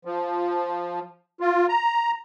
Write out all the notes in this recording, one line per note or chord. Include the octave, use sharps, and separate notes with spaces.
F3
F4
A#5